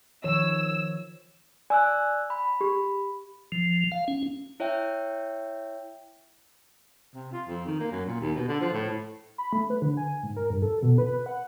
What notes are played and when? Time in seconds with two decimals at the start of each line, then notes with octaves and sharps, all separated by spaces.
0.24 D#3 F3 C#5 E6
1.70 D5 G#5 E6 F#6
2.30 B5
2.61 G4
3.52 F3
3.92 F5
4.08 C#4
4.60 E4 C#5 E5 G5
7.14 C3
7.32 F4
7.48 F2
7.66 D#3
7.80 A#3
7.92 F#2
8.06 A#2
8.21 D#2
8.36 B2
8.48 D3
8.61 F3
8.73 A2
9.38 B5
9.53 A3
9.70 B4
9.82 D3
9.97 G#5
10.23 G#2
10.36 A#4
10.50 G2
10.62 A4
10.83 B2
10.98 B4
11.26 F#5